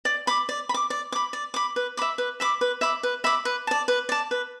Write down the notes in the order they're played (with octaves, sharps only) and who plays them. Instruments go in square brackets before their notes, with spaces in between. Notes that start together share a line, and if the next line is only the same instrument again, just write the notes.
[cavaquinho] D5
B5 D6
D5
B5
D6
D5
B5 D6
D5
B5 D6
B4
E5 B5 D6
B4
E5 B5 D6
B4
E5 B5 D6
B4
E5 B5 D6
B4
D5 A5
B4
D5 A5
B4